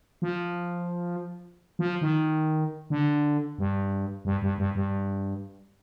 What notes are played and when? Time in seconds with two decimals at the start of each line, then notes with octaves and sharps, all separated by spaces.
0.22 F3
1.79 F3
2.01 D#3
2.90 D3
3.58 G2
4.25 G2
4.42 G2
4.58 G2
4.75 G2